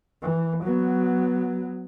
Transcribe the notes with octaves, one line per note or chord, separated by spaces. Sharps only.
E3
F#3 B3